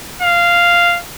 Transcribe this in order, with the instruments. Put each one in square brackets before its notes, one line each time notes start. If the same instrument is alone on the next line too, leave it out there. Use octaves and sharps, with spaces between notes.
[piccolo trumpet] F5